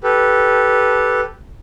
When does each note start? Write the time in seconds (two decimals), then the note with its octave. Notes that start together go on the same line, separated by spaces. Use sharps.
0.03 G4 A4 B4